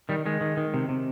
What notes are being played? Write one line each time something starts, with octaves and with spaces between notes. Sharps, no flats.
D#3 G3
D#3 G#3
D#3
D#3
C3
C3